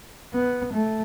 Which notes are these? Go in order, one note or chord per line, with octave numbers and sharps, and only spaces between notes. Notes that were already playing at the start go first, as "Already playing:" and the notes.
B3
A3